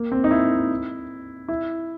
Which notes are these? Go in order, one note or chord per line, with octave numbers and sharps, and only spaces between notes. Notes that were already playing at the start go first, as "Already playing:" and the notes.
Already playing: A#3
C4
D#4
E4
E4